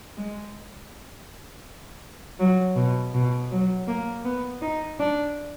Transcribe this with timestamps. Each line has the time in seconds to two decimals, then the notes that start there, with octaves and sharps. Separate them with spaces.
0.17 G#3
2.40 F#3
2.76 B2
3.14 B2
3.51 F#3
3.88 A#3
4.25 B3
4.62 D#4
5.00 D4